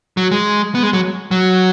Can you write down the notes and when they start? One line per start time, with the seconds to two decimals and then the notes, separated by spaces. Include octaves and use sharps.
0.17 F#3
0.31 G#3
0.75 B3
0.83 G#3
0.93 F#3
1.31 F#3